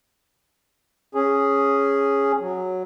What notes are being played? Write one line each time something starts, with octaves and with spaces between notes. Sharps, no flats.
C#4 G#4
F#3